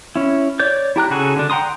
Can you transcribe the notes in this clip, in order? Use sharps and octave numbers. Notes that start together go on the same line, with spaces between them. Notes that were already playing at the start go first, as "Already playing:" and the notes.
C#4 E4
C#5 D5 G6
E4 G4 A#5 F#6
C#3 F#4 G#4 A4
D3 D4
F#5 G5 A#5 C6 D#6